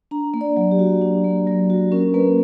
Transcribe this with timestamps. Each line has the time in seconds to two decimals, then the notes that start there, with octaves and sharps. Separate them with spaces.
0.11 D4 A#5
0.34 A#3
0.41 D5
0.57 F#3
0.71 G4
0.79 F#4
1.02 D4
1.24 A#3
1.47 F#3
1.70 F#4
1.92 C#4 A#4
2.14 A#3 B4